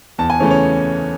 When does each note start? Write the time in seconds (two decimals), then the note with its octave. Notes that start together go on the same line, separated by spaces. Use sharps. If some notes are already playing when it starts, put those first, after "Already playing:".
0.18 E2 A5
0.30 G#5
0.40 C#3 E3 A3 C#4 C#5
0.50 C#5